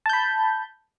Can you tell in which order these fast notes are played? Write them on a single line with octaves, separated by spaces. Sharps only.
A5 G6 B5